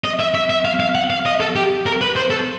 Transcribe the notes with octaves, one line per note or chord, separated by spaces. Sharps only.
D#5
E5
E5
E5
F5
F5
F#5
F5
D#5
A4
G4
A#4
B4
C5
A4